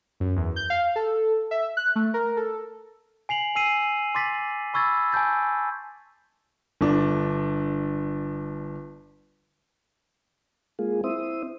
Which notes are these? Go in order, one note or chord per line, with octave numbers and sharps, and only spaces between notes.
F#2
E2
G6
F5
A4
E5
F#6
A3
A#4
A4
G#5 C7 F7 F#7
G#5 E6 C7 D#7
C6 D6 A6 B6
B5 C#6 E6 G#6 A6
G#5 A5 G6 A6
G1 D4
G#3 A#3 F4 G#4
C4 E4 C5 E5 D#6